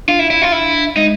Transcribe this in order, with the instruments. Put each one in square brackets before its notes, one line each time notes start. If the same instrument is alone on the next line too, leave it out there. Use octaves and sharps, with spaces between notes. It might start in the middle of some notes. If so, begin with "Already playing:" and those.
[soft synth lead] D4 [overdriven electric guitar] F4
[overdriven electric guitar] E4
E4
F4
E4
[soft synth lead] G#3 [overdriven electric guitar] D#4